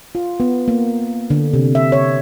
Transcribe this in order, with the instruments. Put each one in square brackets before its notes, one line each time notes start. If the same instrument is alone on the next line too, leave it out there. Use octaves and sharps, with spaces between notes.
[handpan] F4
B3
A#3
D3
C3
E5
C#5